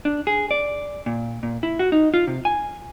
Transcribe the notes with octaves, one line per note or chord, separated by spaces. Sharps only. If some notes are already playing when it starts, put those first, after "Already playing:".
D4
G#4
D5
A#2
A#2
E4
F#4
D#4
F4
C3
G#5